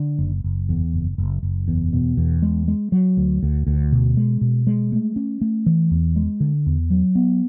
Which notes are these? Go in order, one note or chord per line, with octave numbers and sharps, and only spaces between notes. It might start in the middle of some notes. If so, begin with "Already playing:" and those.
Already playing: D3
F#1
F#1
E2
F#1
F#1
F#1
E2
B2
E2
G#3
G#3
F#3
D2
D2
D2
B2
G#3
B2
G#3
A3
C#4
A3
E3
E2
G#3
D3
E2
F#3
B3